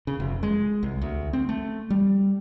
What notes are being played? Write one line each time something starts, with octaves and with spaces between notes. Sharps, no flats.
C#3
F1
G#3
C2
D2
C4
A3
G3